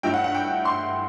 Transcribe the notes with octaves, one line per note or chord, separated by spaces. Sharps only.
G2 F#3 A3 E4 G5
F#5
F#5
G5
C6